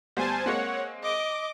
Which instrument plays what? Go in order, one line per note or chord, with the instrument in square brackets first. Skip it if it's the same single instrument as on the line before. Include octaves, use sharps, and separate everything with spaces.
[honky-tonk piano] D2 G3 B3 [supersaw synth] C5 G#5 A5
[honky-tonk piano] G#3 A#3 C4 [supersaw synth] C#5 F#5
[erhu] D#5 [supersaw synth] D6